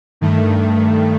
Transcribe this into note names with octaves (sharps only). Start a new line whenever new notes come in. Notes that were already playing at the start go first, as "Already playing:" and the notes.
G2 D#3 A3